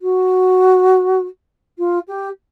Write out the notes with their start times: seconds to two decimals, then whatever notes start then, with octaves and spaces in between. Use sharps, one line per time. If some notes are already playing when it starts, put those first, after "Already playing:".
0.01 F#4
1.78 F4
2.07 G4